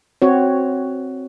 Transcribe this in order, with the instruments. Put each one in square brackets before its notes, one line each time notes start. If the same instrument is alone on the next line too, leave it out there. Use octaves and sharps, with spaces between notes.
[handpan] C4 F#4 C#5